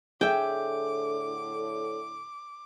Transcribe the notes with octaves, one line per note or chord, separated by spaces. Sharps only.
A2 D3 G#4 E5 G5 D6